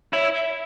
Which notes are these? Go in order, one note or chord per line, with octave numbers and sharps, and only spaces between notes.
E4 C#5
E5